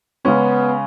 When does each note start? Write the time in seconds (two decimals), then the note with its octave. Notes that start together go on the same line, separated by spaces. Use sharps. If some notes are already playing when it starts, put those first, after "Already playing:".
0.25 C#3 G#3 B3 C#4